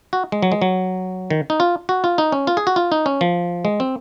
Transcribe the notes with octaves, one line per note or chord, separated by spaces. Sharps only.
F#4
G#3
F#3
G#3
F#3
D#3
D#4
F4
F#4
F4
D#4
C#4
F4
G#4
F#4
F4
D#4
C#4
F3
G#3
C4